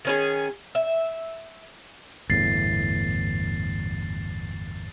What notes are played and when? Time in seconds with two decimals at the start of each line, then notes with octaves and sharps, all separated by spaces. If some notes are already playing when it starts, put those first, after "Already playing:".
0.05 D#3 C#4 G#4
0.75 E5
2.30 G1 E2 A2 A6 C7